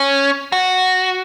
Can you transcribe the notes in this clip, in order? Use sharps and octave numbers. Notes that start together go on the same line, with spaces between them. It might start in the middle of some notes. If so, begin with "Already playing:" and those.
Already playing: C#4
F#4